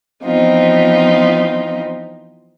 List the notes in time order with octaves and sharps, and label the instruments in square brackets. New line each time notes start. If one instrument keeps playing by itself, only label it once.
[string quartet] E3 F3 B3 C4 D#4 F4